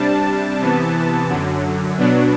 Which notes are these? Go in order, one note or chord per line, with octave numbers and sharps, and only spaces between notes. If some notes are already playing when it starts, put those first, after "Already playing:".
Already playing: C3 G3 D4 A5
C3 E3 B3
F#2 D3 F#3
B2 F#3 B3 D4